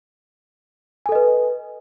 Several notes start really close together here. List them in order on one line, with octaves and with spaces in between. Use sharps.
G#5 A4 D#5 B4